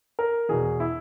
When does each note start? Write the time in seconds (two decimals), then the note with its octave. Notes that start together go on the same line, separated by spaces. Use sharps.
0.19 A#4
0.49 E2 B2 G#4
0.80 E4